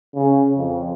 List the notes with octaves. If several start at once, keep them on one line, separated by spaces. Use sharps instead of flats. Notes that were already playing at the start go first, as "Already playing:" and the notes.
C#3
F2